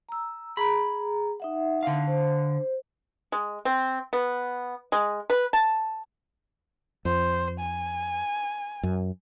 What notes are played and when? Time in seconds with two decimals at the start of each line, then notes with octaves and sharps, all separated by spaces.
0.09 A#5 E6
0.57 G#4 A#5 B5
1.40 D#4 E5 F#5
1.83 D3 F5
2.08 C5
3.32 G#3
3.65 C4
4.13 B3
4.92 G#3
5.30 B4
5.53 A5
7.05 F2 C5
7.60 G#5
8.83 F#2